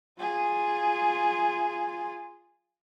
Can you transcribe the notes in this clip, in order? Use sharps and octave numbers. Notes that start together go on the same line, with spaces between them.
F4 G#4